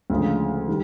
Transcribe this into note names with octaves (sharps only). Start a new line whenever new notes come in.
D2 C#3 F3 G#3
D#3 G3